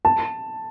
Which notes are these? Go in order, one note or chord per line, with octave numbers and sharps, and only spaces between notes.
A5